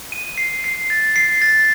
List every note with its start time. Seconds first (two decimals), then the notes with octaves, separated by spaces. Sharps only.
0.12 D#7
0.38 C7
0.64 C7
0.90 A6
1.16 C7
1.42 A6